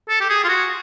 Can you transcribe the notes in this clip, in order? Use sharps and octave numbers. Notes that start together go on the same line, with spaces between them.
A4
G4
G#4
F4
F#4